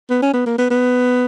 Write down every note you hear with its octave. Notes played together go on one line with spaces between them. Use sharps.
B3
C#4
B3
A#3
B3
B3